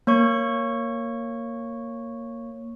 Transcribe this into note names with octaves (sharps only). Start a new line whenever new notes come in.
A#3 C#5 C#6